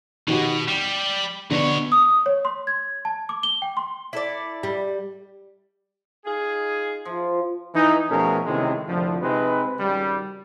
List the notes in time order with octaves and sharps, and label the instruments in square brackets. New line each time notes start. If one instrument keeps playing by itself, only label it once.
[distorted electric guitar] B2 [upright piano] D#3 F#4 G4
[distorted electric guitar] G3 [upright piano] E7
[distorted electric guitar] B2 C#5 [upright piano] D3 B3 D4
[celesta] D#6
C#5
C6
G#6
A5
D6
G7
G5
C6
[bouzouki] E4 A4 D5
[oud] G3
[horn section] D#4 F4 G#4
[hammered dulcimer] F3
[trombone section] E3 D#4
B2 F3 A3 C#4 G#4 A#4
A2 C3 D#3 E3 G#3 C#4
C2 F2 A2 D3 F3
C3 G#3 C4 D#4 B4
G#1 C#3 G3